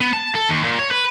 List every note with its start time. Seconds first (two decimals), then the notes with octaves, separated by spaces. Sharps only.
0.01 B3
0.13 A5
0.35 A4
0.49 D#2
0.64 A#2
0.79 C#5
0.91 B4